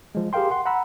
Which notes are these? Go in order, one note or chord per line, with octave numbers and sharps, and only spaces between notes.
F3 G#3
G4 G#4 A#4 F5 G5 C6
F#5 C6
F#5 A#5 B5 E6